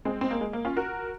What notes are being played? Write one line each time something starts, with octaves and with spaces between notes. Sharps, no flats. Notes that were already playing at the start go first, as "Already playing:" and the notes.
G#3 C4
C4
A#3
G#3
A#3
C#4 F4
F#4 A#4